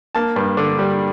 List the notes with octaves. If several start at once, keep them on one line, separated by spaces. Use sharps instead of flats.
A#3 A5
G2
D3
G3